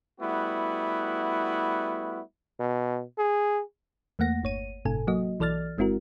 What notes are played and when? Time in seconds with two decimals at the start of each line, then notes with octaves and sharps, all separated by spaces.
0.20 G3 A3 B3 E4 F#4
2.60 B2
3.18 G#4
4.19 E2 A3 A#3 F#5 A#6
4.43 G1 C#5 D#7
4.85 G1 A2 C3 A4 G#5
5.07 F#3 A#3 F#4 D#5
5.40 B1 E3 A4 D5 F6 A6
5.78 G1 G#3 C4 E4 F#4 A#4